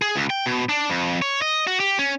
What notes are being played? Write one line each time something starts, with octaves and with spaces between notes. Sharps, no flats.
G#4
C#2
G5
B2
D4
F2
C#5
D#5
F#4
G4
C#4